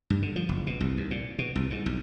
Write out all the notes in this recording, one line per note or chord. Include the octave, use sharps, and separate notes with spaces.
G2
D3
F3
F#1
B2
C2
D#2
A#2
B2
C2
G#2
B1